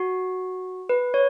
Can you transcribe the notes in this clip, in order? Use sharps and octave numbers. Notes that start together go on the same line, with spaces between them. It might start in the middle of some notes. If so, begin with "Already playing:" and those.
Already playing: F#4
B4
C#5